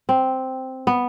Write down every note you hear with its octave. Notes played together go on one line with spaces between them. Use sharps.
C4
B3